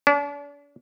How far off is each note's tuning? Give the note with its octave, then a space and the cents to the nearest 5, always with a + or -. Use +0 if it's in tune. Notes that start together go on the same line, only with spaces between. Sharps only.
D4 -40